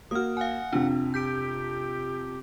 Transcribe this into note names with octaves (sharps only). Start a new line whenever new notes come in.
A#3 F#4 D#6 F6
F5 F#5 G#5
F2 C3 D4
G4 G6 B6 D7